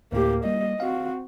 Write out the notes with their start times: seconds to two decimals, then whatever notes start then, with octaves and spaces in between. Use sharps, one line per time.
0.12 D2 A2 A#3 G4
0.45 G3 A#3 D#5
0.80 C4 F#4 F5